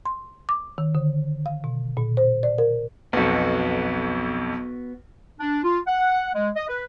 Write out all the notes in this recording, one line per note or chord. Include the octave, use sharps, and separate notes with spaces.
C6
D6
D#3
D3
F5
B2
A#2
C5
D5
A#4
B1 F2 B3 F#4
D4
F4
F#5
G#3
D#5
B4